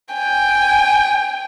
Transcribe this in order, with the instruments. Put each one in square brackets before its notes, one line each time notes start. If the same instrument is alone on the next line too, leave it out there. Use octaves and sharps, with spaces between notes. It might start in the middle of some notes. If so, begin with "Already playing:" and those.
[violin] G5 G#5